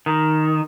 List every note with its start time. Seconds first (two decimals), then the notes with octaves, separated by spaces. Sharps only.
0.06 D#3